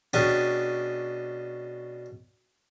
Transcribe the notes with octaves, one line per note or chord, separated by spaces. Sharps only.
B2 C#4 D4 G4 G#4